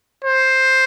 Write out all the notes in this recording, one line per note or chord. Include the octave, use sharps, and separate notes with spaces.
C5